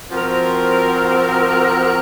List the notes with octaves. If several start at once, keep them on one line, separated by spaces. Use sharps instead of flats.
F3 C4 F#4 A#4